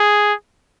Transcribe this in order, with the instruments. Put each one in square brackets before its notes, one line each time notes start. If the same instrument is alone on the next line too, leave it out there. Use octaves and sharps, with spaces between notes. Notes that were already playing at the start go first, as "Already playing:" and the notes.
Already playing: [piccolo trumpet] G#4